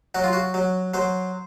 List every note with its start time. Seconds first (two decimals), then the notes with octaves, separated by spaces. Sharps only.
0.15 F#3 F#4
0.24 F4
0.33 F#4
0.54 F#3
0.94 F#3 C5